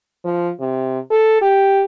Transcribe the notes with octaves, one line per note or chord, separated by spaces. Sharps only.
F3
C3
A4
G4